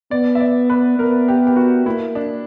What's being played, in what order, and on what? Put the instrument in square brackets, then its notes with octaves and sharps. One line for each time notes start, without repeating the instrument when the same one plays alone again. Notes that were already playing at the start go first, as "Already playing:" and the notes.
[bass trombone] B3 [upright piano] D5
[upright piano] E5
D5
B4
[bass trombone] B3 [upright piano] A#4
[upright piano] G4
G4
F#4
[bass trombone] A#3 [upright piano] E4
[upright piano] D4